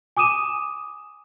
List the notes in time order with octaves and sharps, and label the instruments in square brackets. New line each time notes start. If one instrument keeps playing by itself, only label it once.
[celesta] G#5 D6 D#6 D#7 E7